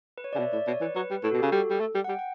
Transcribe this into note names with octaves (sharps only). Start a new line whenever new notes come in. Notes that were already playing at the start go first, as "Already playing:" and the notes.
B4
C#5
D5
C#3
B2 E5
A2 D5
B2 C#5
E3 B4
F#3 B4
G3
A2 A4
F#4
B2
G4
C#3
G3 A4
G3
A3
G3
F#5
G3 G5
F#5